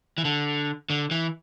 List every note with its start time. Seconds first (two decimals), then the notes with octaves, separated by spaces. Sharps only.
0.18 E3
0.25 D3
0.90 D3
1.11 E3